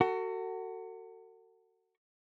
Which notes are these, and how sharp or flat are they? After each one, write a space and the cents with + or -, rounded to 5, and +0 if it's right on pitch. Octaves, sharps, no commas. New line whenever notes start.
F#4 +15 A4 +40